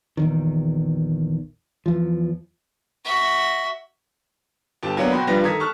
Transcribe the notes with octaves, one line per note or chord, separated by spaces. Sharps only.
A#1 E2 D#3
E2 F3
F#4 E5
G1 G4 A5
F#3 A#3 B3 D4 F#5 A#5
B2 F#4 C5 G5 B5
G2 F3 G3 B4 A#6
D#3 A4 A#5 D#6 G#6 B6
A5 C#6 F6 F#6